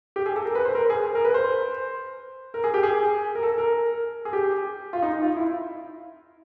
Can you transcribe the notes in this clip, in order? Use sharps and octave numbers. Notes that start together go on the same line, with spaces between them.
G4
G#4
A4
A#4
B4
C5
A#4
G#4
A#4
B4
C5
A#4
G#4
G4
G#4
A#4
A4
A#4
G#4
G4
F4
D#4
F4
E4